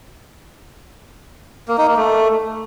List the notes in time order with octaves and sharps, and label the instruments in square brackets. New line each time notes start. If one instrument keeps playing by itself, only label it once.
[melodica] A#3
D#4
A#3
A3